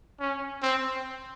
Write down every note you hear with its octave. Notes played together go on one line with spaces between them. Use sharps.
C#4
C4